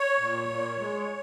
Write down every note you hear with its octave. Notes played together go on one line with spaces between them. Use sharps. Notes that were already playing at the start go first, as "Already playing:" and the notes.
Already playing: C#5
A#2
A#2
G#3